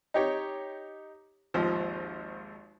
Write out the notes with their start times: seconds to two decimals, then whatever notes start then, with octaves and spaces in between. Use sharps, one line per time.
0.14 D#4 G4 C#5
1.54 G#1 D#2 F3